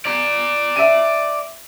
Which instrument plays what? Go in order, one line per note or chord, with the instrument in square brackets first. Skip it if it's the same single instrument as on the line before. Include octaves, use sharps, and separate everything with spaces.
[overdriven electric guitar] D5 A#5
[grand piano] E5 D#7